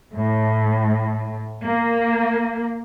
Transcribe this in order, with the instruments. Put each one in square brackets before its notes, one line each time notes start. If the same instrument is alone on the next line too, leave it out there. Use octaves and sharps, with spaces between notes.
[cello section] A2
A#3